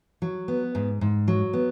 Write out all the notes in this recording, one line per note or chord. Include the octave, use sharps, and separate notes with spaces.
F#3
B3
G#2
G#2
F#3
B3